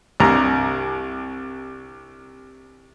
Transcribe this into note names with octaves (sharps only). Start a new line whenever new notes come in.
C2 G2 A#5